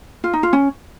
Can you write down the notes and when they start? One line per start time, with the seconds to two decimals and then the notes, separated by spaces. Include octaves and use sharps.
0.24 F4
0.33 D#4
0.43 F4
0.53 C#4